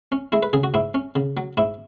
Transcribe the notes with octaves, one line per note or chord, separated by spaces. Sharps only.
C#4
G#3 E4
B4
C#3 G#4
F#4
G#2 E4
C#4
C#3
F#3
G#2 E4